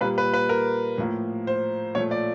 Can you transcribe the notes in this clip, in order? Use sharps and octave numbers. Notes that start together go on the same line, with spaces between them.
A#2 G3 A#3 B4
B4
B4
A#4
A2 F3 A#3
C5
A#2 F3 A3 C#5
D5